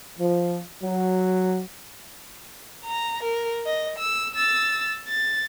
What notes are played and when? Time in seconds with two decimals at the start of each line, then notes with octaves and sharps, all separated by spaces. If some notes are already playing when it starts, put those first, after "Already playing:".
0.19 F3
0.83 F#3
2.85 A#5
3.23 A#4
3.66 D#5
3.99 E6
4.35 E6 A6
5.07 A6